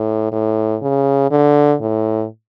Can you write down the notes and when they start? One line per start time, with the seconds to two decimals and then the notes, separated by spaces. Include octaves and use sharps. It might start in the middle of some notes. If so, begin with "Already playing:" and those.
Already playing: A2
0.32 A2
0.82 C#3
1.31 D3
1.81 A2